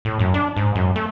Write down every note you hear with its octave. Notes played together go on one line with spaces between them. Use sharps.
A2
F#2
D4
G#2
F#2
A3